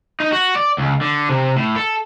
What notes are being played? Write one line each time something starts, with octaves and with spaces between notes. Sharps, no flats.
D#4
F#4
D5
C#2
D3
C3
A2
A4